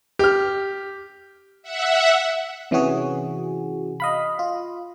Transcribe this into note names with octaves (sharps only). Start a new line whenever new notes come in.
G4 F6
E5 F#5
C3 E3 C#4 F#4 G#4
D#5 F5 B5
F4